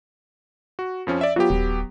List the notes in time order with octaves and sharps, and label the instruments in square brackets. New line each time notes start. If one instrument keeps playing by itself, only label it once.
[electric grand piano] F#4
F2 F3 C#4
D5 E5
[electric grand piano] F#3 B3 G4 [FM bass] F4
[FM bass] D#1